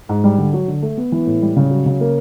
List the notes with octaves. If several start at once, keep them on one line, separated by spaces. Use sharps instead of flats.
G#2
G3
D3
F#3
D3
A3
B3
E3
A2
G3
C#3
F#3
C#3
A#3